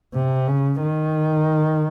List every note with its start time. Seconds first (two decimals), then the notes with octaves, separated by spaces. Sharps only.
0.14 C3
0.48 C#3
0.83 D#3